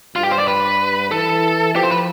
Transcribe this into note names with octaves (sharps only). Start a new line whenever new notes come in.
G2 F4
G4
C5
D5
B4
E3 A4
F3 G4
C5
B4